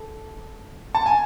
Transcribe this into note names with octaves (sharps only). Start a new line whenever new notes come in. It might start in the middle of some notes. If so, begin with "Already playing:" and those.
Already playing: A4
A5
G#5